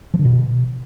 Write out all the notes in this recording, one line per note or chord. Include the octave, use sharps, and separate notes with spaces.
F3
D3
B2